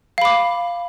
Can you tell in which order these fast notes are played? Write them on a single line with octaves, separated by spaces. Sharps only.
F5 B5 D6